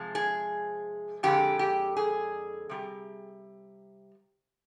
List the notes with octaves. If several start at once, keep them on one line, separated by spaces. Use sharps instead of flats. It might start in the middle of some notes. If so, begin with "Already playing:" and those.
Already playing: C3 F3 G#3
G#4
F2 D3 G#3 G4
G4
G#4
C3 G3